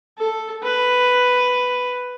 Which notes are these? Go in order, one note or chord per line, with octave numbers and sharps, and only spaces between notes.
A4
B4